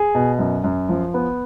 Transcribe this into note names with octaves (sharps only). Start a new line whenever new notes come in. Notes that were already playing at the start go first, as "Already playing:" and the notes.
Already playing: G#4
B2
F#2
F#2
F3
B3